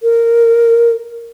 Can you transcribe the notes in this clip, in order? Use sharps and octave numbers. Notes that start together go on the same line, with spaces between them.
A#4